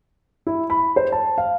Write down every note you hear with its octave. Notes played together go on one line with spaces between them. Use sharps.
E4
B5
C5
A5
F5